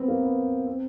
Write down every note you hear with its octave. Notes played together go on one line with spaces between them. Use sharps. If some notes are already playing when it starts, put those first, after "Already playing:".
Already playing: B3 C4
A#3
B3
C4